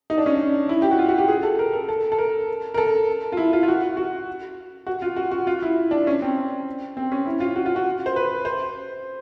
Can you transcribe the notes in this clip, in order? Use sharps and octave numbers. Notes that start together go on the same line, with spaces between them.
D#4
D4
C#4
D4
E4
G4
F#4
F4
F#4
G4
G#4
A4
A#4
A#4
A4
A4
A#4
A#4
A4
F4
E4
F4
F4
F#4
F#4
F#4
F4
F#4
F#4
F4
E4
D4
C#4
C4
C4
C#4
E4
F4
F#4
F4
F#4
C5
B4
C5